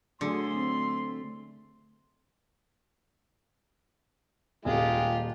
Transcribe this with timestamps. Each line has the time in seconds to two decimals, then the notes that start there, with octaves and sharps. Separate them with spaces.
0.21 D3 F#3 A3 D4 G#4 C6
0.55 C4
4.65 D#1 G#3 F4 G4